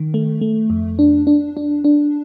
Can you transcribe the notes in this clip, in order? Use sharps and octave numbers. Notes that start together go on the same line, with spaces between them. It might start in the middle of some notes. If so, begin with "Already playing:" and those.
Already playing: D#3
A3
A3
F2
D4
D4
D4
D4